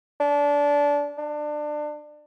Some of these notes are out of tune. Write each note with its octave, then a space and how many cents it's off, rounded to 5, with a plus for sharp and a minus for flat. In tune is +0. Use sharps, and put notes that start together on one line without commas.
D4 -25
D4 +25